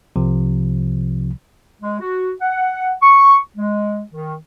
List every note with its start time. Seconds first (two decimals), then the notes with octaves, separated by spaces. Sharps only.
0.16 C2 C3 F3
1.81 G#3
2.00 F#4
2.41 F#5
3.02 C#6
3.56 G#3
4.12 D#3